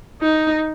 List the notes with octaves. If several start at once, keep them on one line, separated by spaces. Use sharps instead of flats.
D#4